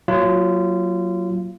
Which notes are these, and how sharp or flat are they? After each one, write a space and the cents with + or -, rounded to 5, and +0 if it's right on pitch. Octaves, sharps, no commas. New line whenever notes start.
F#3 +0 A#3 +0 F4 -25